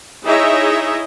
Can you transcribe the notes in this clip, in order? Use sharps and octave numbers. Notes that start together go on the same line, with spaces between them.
D#4 E4 G#4 C#5 D#5 E5